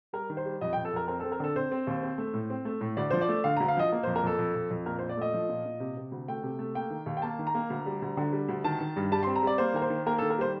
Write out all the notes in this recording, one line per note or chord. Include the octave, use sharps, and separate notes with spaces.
G3 A#4
D#3
C5
G3
F2 D#5
G5
F2
A4
F2 A#4
C4 A#4
A4
C4
A#4
D3 A4
C4 C5
C4
D#2
C4
A3
A2
C4
A3
A2
D2 D5
F3 C5
D5
A3
D3 F5
A#5
D2
F5
F3 D#5
A#3
C5
F2
A#4
F2 A4
F2
F2
F2
A#2 A#4
C5
A#2
D5
A3 D#5
F3
A#2
A#2
C3
C3
D2
A3 G5
C3
A3
A#3 G5
D#3
D#2
G5
A#3 A5
D#3
A#5
A#3
D2
G3
D2
D3
G3
D2
D#3 A5
D#3
G2
G3 A5
C6
C4
A#5
G3 D5
A#3 C5
D#3 A#4
C5
D#3
A#3 A#4
A4
D#3
A#4
G3 C5